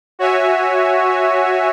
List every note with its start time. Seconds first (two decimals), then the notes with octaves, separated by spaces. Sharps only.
0.19 F#4 C#5 E5 G#5